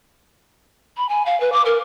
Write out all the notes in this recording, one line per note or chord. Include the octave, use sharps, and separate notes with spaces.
B5
G#5
F5
B4
D6
A#4